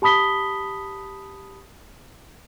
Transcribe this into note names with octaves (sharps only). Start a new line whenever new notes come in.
G4 A5 B5 D#6 B6 G7